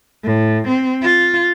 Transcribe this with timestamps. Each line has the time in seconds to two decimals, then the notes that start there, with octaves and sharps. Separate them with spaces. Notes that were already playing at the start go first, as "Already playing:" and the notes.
0.25 A2
0.68 C4
1.02 F4